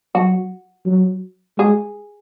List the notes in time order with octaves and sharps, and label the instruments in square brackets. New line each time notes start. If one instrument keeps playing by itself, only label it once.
[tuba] F#3 [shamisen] F#4
[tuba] F#3
[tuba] G#3 [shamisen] G#4